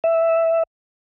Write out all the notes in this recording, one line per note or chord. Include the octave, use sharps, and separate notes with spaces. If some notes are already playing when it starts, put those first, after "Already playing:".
E5